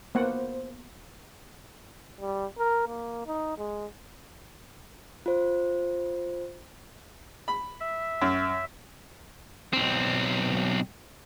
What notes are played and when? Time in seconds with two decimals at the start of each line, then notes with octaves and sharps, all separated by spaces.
0.15 A#3 B3 C5 F#5
2.21 G3
2.59 A#4
2.88 A#3
3.27 D#4
3.58 G#3
5.26 F4 C5
7.48 B5
7.80 E5
8.22 F#2
9.73 B1 C4